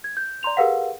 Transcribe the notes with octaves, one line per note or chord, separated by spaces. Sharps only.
G#6
G6
D5 A#5 C6 F7
G4 G#4 A#4 B4 F5 F#5